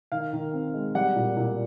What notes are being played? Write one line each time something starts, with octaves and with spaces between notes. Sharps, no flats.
D#3 F5
D#3
C4
G#3
G3 F#5
A#2
A#2